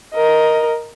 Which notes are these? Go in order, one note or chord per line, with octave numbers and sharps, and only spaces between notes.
A#4 D#5